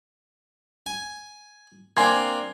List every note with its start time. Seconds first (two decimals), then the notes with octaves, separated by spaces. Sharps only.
0.86 G#5
1.97 A#3 C4 D4 G#5 C6 G#6